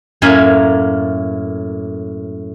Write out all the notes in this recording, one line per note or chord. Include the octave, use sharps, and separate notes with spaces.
F#2 A2 A#3 E5 G#5